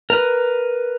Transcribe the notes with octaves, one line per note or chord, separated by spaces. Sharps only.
A#4 B4